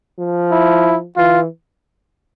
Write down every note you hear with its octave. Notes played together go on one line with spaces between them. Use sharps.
F3
E4
E3 F4